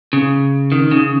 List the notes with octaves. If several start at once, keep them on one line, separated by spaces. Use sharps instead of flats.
C#3
D#3
C#3